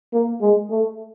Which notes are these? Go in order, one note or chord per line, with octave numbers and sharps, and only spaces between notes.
A#3
G#3
A3